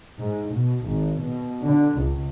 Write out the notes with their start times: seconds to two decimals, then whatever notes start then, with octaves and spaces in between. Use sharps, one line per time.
0.18 G#2
0.54 B2
0.86 G#1
1.21 B2
1.64 D3
1.99 C#2